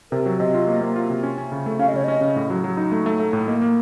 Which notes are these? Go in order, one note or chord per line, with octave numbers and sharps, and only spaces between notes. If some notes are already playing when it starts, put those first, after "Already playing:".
C3 A#4
F#3
C3 D#5
F4
A#3
A#3
F4
C3
C#4
C#4
C#3
A3
C#4 F5
D#5
C#3 C#5
C#4 D#5
C#3
A2
F#3
F#3
D#4
A3
A3
A3
A2
A#3 D#5
A#3